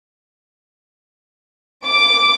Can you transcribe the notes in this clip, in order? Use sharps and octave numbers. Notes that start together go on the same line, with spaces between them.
D6